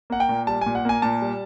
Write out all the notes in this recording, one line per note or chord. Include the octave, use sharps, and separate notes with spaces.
A#3 F#5
G5
A#2
G3 A5
G#5
A#2
F#5
A#3 G#5
A#2 A5
G3